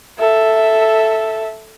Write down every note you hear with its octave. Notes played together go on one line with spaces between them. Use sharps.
A4 E5